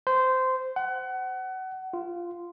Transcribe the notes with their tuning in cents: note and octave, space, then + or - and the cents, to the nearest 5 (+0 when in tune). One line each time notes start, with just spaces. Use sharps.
C5 -15
F#5 +25
F4 -10